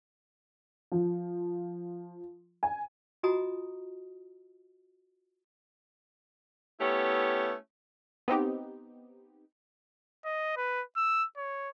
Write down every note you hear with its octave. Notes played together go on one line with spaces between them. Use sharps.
F3
G#5
F4 F#4 D#5 G#5 A#5 D#6
A3 B3 C#4 E4 G4
B3 C4 D#4 G4
D#5
B4
E6
C#5